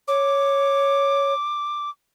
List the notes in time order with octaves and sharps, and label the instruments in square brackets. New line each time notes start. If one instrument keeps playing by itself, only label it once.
[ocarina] C#5 [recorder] D6